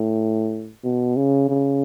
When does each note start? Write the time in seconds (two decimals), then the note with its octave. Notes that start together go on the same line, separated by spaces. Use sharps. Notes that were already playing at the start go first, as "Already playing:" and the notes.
Already playing: A2
0.84 B2
1.17 C#3
1.49 C#3